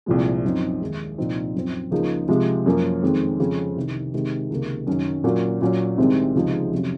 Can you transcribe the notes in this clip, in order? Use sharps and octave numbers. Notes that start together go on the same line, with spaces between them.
C2 A#2 F3 G#3
F#2 F3 C4 D#4
D#2 D#3 G#3
C2 A#2 F3 C4 D#4
F#2 F3 C4
C#2 C#3 F3 A#3 D#4
C3 F3 G#3
F#2 F3 A#3 C#4
F2 D#3 G#3 C4
F2 C#3 F3 G#3 C4
C2 C3 D#3
C3 D#3 G#3
C#2 C3 D#3 A#3
F#2 D#3 F#3 C#4
A#2 F#3 A#3 C#4
A#2 F#3 C#4
C2 C3 D#3 G#3 C4
C#2 C3 F3 G#3 D#4
F2 C3 F#3 C#4